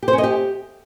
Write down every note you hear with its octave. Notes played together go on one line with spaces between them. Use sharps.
G4
C5
C#4
D#5
G4